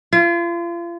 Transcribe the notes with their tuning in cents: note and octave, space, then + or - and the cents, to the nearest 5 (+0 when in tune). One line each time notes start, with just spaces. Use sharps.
F4 -35